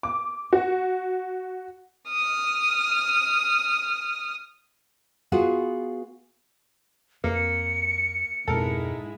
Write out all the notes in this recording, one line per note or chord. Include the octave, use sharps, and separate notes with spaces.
D6
F#4
D#6 F6
B3 F4 F#4 G#4
F2 A#3 C4 C#7
F2 G#2 B2 G#3 C4 E4 A4 A#4